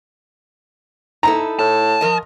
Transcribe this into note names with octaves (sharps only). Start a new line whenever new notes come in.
D#4 E4 A4 A#5
A2 A5
F3 A#4 D#5